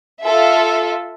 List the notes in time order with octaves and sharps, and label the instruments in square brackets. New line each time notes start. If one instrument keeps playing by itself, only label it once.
[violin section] F4 A4 E5